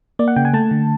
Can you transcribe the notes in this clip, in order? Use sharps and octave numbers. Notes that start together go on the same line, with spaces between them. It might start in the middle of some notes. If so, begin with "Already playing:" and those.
A#3 D5
F#5
C#3 G5
G#5
A3 A5
D3